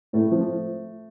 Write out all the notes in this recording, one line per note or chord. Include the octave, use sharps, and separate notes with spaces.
A2 A3
F3